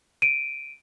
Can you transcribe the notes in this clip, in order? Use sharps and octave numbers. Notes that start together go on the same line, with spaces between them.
D7 D#7